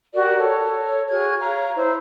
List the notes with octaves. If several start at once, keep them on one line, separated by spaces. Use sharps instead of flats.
F#4 G4 A#4 D5
A4 C#5
F#4 G#4 F6 G#6
C#5 F5 A#5
E4 C5